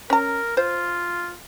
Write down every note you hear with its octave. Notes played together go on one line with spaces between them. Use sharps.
C#4 A#4 A#5
F4 C5